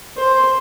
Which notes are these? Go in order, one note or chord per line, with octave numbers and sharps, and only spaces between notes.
C5